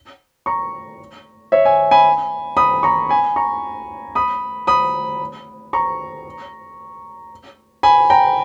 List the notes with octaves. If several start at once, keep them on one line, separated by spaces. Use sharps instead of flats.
A#5 C#6
C#5 E5
E5 G#5
G#5 B5
B5 D#6
A#5 C#6
G#5 B5
A#5 C#6
B5 D#6
B5 D#6
A#5 C#6
G#5 B5
G5 A#5